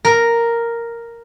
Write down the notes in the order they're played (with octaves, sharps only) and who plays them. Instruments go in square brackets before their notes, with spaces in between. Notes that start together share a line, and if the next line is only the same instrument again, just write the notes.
[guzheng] A#4